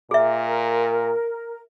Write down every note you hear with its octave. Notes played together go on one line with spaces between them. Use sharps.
A#2 G#4 A#4 E5